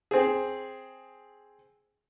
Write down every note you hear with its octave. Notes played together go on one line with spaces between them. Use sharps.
C4 G#4